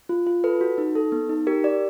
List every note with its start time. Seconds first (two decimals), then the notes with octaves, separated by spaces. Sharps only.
0.09 F4
0.27 F4
0.44 A4 B4
0.61 F#4
0.78 D#4
0.96 A4
1.12 B3
1.29 D#4
1.47 G4 A#4
1.64 G4 D5